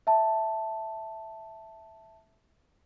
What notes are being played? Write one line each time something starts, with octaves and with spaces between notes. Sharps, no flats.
E5 A5